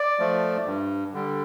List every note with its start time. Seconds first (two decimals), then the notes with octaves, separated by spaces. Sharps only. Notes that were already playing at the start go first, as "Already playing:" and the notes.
Already playing: D5
0.19 F3 A3
0.66 G2
1.13 D3 G3